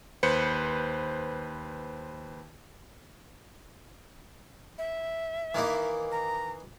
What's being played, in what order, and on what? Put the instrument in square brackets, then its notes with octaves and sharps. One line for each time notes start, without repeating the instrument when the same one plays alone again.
[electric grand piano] D#2 B4 C5 C#7
[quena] E5
[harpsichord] D#3 E3 A#3
[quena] A#5